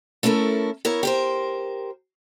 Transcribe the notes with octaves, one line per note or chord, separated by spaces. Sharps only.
A3 C#4 E4 A4 A#4
B3 E4 A#4 C#5
G4 A#4 C5